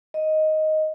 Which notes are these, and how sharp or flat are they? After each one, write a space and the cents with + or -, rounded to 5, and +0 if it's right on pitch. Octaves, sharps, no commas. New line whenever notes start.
D#5 +5